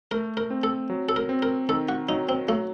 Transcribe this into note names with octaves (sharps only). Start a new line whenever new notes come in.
A3 A#4
A#4
C4
A4
F#3
A4
A#4
C4
A#4
D#3 A4
F#4
F#3 D#4
C4
F#3 A3